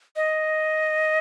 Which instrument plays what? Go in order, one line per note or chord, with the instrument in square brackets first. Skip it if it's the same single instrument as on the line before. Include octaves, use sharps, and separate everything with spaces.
[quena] D#5